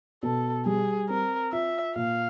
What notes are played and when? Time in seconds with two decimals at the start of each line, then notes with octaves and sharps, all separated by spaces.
0.23 B2 A4
0.66 G3 G#4
1.09 C4 A#4
1.52 F4 E5
1.96 A#2 F5